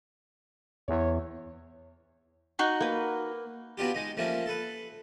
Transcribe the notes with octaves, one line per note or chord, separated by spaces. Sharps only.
E2 C#5
D#4 F#4 F#5
A#3 B4
F#3 B3 D4 F4 G4
G#3 D#4
F3 A3 A#3 C#4
A4 B4